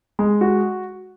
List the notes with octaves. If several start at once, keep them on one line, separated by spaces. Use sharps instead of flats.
G#3
F#4